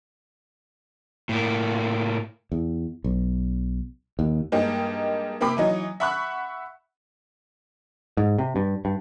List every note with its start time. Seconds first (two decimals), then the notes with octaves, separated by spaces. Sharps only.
1.29 A2 A#3
2.52 E2
3.04 B1
4.19 D#2
4.52 G2 G#3 A#3 D#4 G4
5.41 C3 A#3 G4 B5 D6
5.57 E3 F#3 D#4
6.00 E5 F#5 B5 C#6 F#6
8.17 G#2
8.38 C3
8.56 G2
8.85 G2